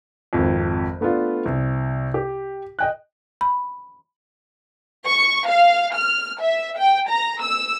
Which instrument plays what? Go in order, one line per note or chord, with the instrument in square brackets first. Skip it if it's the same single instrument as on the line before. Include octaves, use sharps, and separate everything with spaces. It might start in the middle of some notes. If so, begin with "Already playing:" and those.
[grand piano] G#1 F2
A3 B3 D4 F4
C2
G4
D#5 G5 F#6
[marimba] B5
[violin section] C#6
F5
F6
E5
G5
A#5
E6